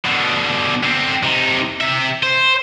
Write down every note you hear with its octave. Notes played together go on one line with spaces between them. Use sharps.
B2 D3
D3 C4
C3 D#4
C3 E5
C5